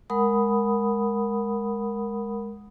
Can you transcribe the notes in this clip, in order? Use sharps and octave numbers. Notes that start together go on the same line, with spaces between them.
G#3 A#4 F#5 B5 D#6